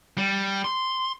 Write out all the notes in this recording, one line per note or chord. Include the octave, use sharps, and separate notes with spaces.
G3
C6